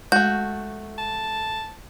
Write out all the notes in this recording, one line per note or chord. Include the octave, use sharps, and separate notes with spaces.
G#3 A3 F#4 G6
A5